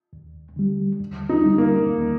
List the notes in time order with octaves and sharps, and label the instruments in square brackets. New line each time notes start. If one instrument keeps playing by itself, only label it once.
[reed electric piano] D#2
D3 G3
D#2
[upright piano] D#4
[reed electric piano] D3 G3
[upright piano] A#3
[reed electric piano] D#2